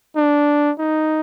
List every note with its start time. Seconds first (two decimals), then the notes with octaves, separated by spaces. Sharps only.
0.16 D4
0.79 D#4